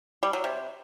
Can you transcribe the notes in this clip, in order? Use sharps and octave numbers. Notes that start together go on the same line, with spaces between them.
G3
F#3
C3